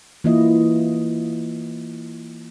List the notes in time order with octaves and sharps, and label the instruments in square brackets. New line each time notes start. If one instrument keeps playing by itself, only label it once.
[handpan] E3 A#3 E4 F4 D#5